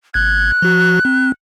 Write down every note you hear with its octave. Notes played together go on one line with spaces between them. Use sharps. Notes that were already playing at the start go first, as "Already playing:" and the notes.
G#1 F#6 G#6
F3 F#4
C4